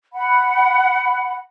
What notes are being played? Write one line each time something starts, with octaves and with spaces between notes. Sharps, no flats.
F#5 B5